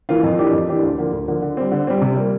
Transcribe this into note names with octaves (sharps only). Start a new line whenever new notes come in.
E3 A#3 F4
F2
E3 A#3 D4 G4
F2
E3 A#3 D4 G4
D2
D3 F3 A#3
D2
D3 F3 A#3
D3
G3 C4
D3
G3 C4
C3
G3 A#3